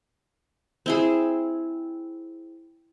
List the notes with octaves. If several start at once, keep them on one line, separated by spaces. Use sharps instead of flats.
C4 E4 G#4